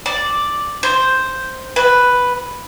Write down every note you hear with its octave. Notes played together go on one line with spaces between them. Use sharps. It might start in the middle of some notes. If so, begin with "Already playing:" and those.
D5
C5
B4